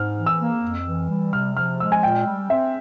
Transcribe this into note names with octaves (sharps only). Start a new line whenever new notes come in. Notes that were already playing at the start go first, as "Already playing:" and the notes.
Already playing: G#2 F6
E3
E6
A#3
F2
E3
G3
C3 F6
F3 F6
G#3 E6
G#5
A#2 G5
G3
C4 E5